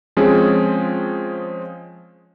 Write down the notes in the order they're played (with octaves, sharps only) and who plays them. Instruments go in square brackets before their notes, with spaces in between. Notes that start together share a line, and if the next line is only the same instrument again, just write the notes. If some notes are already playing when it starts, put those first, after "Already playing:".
[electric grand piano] F3 G#3 C4 C#4 G#4